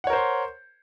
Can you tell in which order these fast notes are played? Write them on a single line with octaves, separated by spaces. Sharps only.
F#5 C#5 A#4 C5 C6